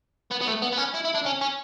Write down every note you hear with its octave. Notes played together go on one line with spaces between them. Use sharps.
B3
B3
A3
B3
B3
C#4
E4
E4
D4
C#4
C#4